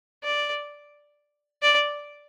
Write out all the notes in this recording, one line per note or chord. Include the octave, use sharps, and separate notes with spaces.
D5
D5